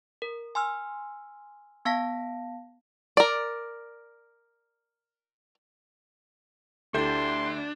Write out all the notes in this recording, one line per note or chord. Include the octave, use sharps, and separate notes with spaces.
A#4
G#5 C6 E6 F6
B3 F5 A5 A#6 B6
A#4 D5
D2 D4 E4 G4 A4 E5 C6 G6